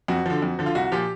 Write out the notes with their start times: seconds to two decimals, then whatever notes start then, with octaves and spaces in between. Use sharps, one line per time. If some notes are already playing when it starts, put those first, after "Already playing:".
0.08 F2 F#4
0.26 D3 F3
0.42 F2
0.59 D3 F3
0.66 F4
0.75 C2 F#4
0.92 A#2 F3 G4